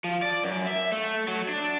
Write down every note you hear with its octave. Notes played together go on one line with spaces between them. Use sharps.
F3
D5
F#2
E5
A3
F#3
D4